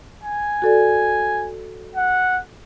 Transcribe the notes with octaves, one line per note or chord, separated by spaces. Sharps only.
G#5
F#4 A4 D5
F#5